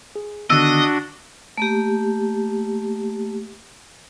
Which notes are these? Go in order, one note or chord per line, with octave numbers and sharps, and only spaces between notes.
G#4
D3 D#3 B3 D4 F#4 D#5 E6
A3 A#3 G4